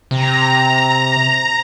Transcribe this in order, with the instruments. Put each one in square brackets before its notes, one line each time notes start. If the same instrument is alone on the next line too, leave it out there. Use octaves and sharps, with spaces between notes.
[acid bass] C3 [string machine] A#5